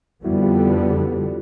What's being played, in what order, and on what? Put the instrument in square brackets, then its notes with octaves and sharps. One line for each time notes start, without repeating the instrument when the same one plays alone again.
[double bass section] F2 D3 G3 B3 [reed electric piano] E4 F#4
[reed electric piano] F4 G4
G4 A4